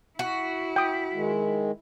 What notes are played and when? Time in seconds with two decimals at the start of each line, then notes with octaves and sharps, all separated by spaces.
0.19 E4 F#4
0.76 G5 D#6
1.13 D#3 G#3